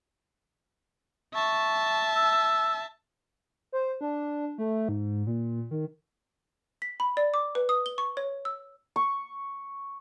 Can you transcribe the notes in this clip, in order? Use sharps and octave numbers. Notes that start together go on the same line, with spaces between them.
E5 A5 C#6
E6
C5
D4
A3
G#2
A#2
D#3
B6
B5
D5
D6
B4
D#6
G7
C#6
C#5
E6
C#6